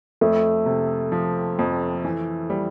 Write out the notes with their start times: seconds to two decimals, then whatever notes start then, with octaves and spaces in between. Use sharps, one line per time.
0.21 F2 A3
0.66 C3
1.12 F3
1.59 F2
2.05 E3
2.50 G3